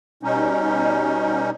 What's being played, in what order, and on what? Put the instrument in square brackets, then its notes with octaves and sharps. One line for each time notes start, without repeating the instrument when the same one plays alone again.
[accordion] B2 G3 C#4 D#4